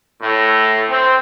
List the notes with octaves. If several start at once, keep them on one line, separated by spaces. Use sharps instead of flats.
A2
C4